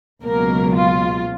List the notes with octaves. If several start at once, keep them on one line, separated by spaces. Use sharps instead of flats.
C#2 B2 F#3 A#3 A#4
F4